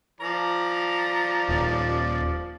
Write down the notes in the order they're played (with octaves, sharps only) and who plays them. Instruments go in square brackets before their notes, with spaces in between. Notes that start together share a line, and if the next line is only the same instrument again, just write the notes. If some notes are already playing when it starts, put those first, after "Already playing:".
[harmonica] F3 D5 [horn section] A#5
[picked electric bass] D#1